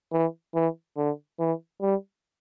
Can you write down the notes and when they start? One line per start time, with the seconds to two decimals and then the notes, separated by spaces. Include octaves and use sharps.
0.12 E3
0.54 E3
0.97 D3
1.39 E3
1.81 G3